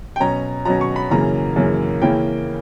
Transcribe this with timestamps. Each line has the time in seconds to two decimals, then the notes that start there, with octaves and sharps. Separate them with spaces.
0.16 G5
0.20 B2 F#3 C#4 A#5
0.65 B2 F#3 C#4 A#5
0.81 C#6
0.96 B5
1.11 F#2 C#3 E3 A#3 A#5
1.56 F#2 C#3 E3 A#3
2.02 C#3 E3 A#3 C#4 E4 G5